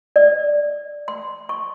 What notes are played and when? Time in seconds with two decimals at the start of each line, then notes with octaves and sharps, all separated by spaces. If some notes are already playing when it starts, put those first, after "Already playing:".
0.16 D5
1.08 C6
1.49 C#6